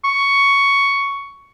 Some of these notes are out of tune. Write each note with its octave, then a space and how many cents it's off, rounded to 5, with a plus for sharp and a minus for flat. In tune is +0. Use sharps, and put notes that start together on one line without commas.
C#6 +10